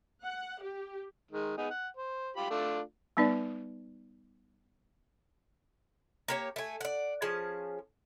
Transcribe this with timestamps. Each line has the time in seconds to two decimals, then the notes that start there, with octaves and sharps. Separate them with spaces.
0.23 F#5
0.63 G4
1.31 D#3 G#3
1.58 B3 D#4 G#4
1.70 F#5
1.97 C5
2.36 F4 G4 B5
2.50 A3 D4 F4
3.17 G3 B3 D#4 B4 D5
6.28 A#3 G4 C#5
6.56 A3 G#5
6.81 D5 F#5
7.22 F3 C#4 G#4 A5